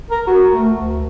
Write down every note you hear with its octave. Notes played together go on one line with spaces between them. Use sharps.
A#4
F#4
A3
D2